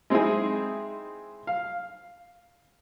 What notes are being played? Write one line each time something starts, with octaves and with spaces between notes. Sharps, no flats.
G#3 C4 D#4 E4 G#4
F5